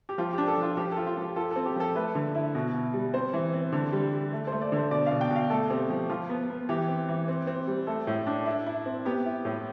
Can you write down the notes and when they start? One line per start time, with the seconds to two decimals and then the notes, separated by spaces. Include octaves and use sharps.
0.09 G4
0.18 F3 F4
0.33 D4 G4
0.47 A4
0.58 F3 F4
0.77 F3 G4
0.92 F4 A4
1.07 F4
1.17 F3 G4
1.36 F4 A4
1.51 C4 A4
1.66 G4
1.76 F3 A4
1.95 A3 B4
2.15 D3
2.35 E4
2.55 B2
2.74 B2
2.94 G3
3.14 C4 C5
3.33 E3
3.53 C4
3.72 D3
3.92 G3
4.13 G3
4.33 A3
4.47 A3 C5
4.61 D5
4.72 D3 C5
4.91 B2 D5
5.06 B2 F5
5.21 G5
5.30 B2
5.36 F5
5.50 A3 A4
5.70 C4 G4
5.90 F3 G4
6.09 F3 F4
6.29 B3
6.50 B3
6.69 E3 G4
6.88 C4
7.09 E3
7.28 C4
7.47 C4
7.67 G3
7.87 A3 A4
8.07 A2
8.26 D4
8.46 E4
8.66 E4
8.86 C4
9.05 B3 G4
9.25 E4
9.45 A2